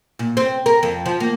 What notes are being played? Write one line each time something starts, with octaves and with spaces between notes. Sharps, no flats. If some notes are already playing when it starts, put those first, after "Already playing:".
A#2
C4
A#4
F2
F3
A#3